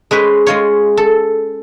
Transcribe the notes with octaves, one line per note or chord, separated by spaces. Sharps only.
G#3 C#4 B4 C5
G#3 F4 C#5
A4